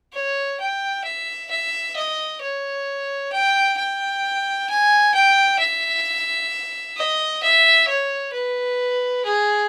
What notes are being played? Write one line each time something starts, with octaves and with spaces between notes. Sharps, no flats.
C#5
G5
E5
E5
D#5
C#5
G5
G5
G#5
G5
E5
D#5
E5
C#5
B4
G#4